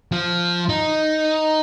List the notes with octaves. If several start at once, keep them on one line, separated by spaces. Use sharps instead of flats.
F3
D#4